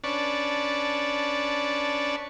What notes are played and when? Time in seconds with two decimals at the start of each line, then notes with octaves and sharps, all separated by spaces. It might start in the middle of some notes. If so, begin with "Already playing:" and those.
0.04 C#4 D4 B4 D5 A5 C#6